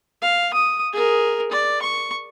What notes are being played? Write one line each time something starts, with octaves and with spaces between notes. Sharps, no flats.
F5
D#6
G#4 A#4
D5
C#6